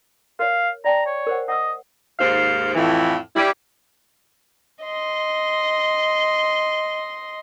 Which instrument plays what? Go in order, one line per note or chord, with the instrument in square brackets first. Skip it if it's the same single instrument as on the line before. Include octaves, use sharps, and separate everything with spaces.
[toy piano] A#4 C#5 [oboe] F5
[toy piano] D5 G5 A5 [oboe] A#5
[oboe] C#5
[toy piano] A#4 C5 F#5
[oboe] D#5 [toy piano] F#5 E6
[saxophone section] D#2 G#2 C5 F5
F2 A2 E3
G3 E4
[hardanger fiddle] D#5 C6